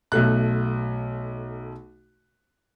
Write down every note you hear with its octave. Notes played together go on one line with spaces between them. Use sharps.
B1 A3 F#6